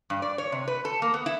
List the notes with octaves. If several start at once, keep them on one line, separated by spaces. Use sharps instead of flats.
G2
D5
C#5
C3
B4
A4
A#3
B3
E4